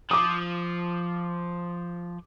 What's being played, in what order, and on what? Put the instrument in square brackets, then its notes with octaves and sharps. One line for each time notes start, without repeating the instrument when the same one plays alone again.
[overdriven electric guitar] F3 [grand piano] D6 D#6